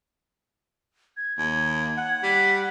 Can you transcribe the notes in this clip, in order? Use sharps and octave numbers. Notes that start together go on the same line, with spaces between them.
G#6
D#2 G#6
F#5
G3 B6